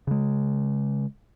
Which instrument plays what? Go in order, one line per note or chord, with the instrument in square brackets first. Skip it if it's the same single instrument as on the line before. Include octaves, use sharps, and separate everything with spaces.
[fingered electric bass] C#3 G#3